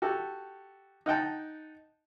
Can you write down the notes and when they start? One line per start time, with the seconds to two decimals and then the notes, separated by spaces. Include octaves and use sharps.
0.02 F#4 G4 A4
1.06 D#4 F#5 G5 A5